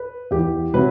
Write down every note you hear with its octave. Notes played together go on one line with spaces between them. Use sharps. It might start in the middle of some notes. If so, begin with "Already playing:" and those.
Already playing: B4
E2 G4
C3 F#3 B4